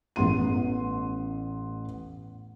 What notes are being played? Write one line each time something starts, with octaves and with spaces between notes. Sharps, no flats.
A1 B3 C6 D#7